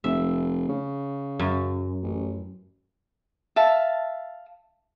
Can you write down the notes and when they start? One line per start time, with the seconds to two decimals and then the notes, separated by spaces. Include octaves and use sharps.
0.04 F1 E5
0.69 C#3
1.39 F#2
2.03 A1
3.56 E5 F5 A5